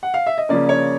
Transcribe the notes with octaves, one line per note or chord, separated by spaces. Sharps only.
F#5
F5
E5
D#5
C#3 F3 A#3 C#4 D5
C#5